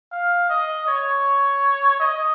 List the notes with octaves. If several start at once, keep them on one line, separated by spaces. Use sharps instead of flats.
F5
D#5
C#5
D#5